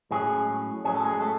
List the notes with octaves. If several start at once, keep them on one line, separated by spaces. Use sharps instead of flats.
A2 F#3 G#3 C#4 G#4
A2 F#3 C#4 G#4
A4
G#3 G#4
A3 A4